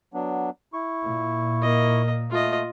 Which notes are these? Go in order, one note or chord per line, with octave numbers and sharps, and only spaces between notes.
F#3 B3 D4
E4 C#6
A#2
A#3 D#5
A3 F4 D#5